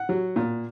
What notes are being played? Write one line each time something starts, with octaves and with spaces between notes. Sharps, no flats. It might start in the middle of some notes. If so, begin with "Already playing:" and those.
Already playing: F#5
F#3
A#2